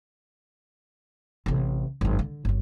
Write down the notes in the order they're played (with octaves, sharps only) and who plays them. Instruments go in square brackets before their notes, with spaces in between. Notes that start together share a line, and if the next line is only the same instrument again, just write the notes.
[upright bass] A1 C3
G#1 F#2
D3
G1 F#3